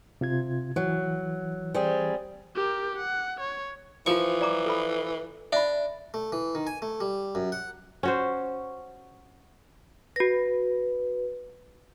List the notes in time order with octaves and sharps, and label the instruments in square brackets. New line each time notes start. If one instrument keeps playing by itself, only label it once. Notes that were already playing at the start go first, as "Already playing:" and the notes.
[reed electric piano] C3 F4 G#6
[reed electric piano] E3 [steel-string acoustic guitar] F#3
[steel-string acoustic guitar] G3 C4 G#4
[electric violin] G4 A#4
F#5
C#5
[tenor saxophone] E3 [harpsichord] F3 C#6 [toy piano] F4 A#4 C5
[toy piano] D5 A#5 D6
A4 B4 B5
[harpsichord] D4 [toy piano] E5 B5
[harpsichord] A3
E3
D#3
G#5
A3
G3
F#2
F#5
[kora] C#4 F#4 C5
[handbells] F#4 A#6 [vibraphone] B4